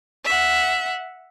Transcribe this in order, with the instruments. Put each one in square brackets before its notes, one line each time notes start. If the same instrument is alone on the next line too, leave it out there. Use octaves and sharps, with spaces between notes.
[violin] E5 F#5